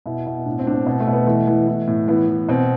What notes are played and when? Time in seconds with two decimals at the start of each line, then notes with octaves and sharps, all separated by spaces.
0.06 B2 E4
0.26 B2
0.45 A2 D4
0.59 C4
0.66 A2 D4
0.73 C4
0.86 B2 C4
1.00 A3
1.07 B2
1.13 B3
1.27 E3 A3
1.47 E3
1.68 E3
1.87 A2
2.08 E3 B3
2.28 E3
2.48 B2 C4